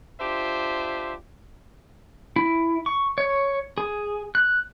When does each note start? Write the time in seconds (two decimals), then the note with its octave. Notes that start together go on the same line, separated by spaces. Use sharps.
0.21 D4 F4 G4 C5 E5
2.36 E4
2.86 C#6
3.18 C#5
3.78 G#4
4.35 F#6